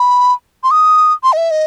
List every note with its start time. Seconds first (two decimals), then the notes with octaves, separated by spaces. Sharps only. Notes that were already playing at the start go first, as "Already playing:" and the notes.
Already playing: B5
0.64 C6
0.71 D#6
1.23 C6
1.33 D#5
1.37 E5
1.51 D#5